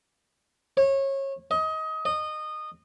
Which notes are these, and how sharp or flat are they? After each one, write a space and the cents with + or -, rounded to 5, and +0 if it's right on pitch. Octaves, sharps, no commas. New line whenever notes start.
C#5 -25
D#5 +25
D#5 -20